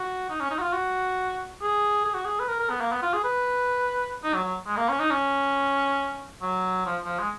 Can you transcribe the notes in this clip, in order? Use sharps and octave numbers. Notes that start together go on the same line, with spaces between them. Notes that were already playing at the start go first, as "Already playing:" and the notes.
Already playing: F#4
D#4
C#4
D#4
F#4
F4
F#4
G#4
G#4
F#4
G#4
B4
A#4
A#4
B3
A#3
B3
F4
G#4
B4
D#4
F#3
F#3
G#3
A#3
C#4
D#4
C#4
F#3
F3
F3
G#3